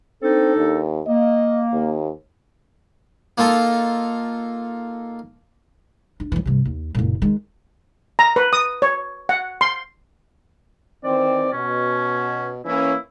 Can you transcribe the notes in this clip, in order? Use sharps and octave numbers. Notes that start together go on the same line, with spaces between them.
C4 D4 D#4 A4
D#2
A#3 D#5
D#2
A#3 D#4 F4 A4
D4
E3 F#3
G2 C3
D#2
F#1 A#2
D#3 G#3
A#5
B4
D#6
C#5
F#5
C6
D#3 E3 C4 D5
B2 C#4
E3 A#3 C#4 E4